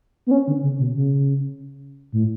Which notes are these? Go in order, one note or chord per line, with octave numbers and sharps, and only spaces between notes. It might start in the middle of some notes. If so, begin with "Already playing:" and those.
B3
C#4
D3
C#3
B2
C#3
A2